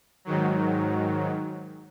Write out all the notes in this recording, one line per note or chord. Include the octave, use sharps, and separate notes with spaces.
G#2 D#3 F#3